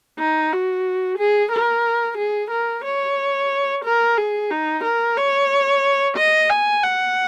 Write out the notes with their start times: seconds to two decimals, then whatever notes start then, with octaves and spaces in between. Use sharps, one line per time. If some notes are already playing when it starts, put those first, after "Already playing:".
0.19 D#4
0.52 F#4
1.18 G#4
1.52 A#4
2.18 G#4
2.51 A#4
2.85 C#5
3.85 A#4
4.17 G#4
4.51 D#4
4.84 A#4
5.17 C#5
6.17 D#5
6.50 G#5
6.83 F#5